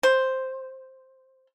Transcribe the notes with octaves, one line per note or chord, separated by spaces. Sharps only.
C5